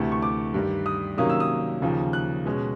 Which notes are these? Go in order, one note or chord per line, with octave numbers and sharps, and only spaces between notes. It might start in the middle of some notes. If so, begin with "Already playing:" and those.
Already playing: D2 C3 E3 A3 C#6
C#6
D6
G2 D#3 G3
D#6
C3 D#3 F#3 A#3 C#4 D#6
E6
D#6
D#2 C#3 F3
F#6
B2 G#3 C#4